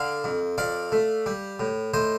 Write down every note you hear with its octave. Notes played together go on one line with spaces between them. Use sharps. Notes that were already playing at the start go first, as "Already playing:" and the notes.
Already playing: D3 D5 F5
F2
F2 D5 F5
A3
G3
A2
A2 C5 D#5